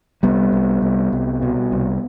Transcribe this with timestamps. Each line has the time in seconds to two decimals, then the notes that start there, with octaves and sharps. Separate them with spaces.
0.23 C2 G3 B3
0.53 C2
0.82 C2
1.13 C2
1.42 B2
1.72 C2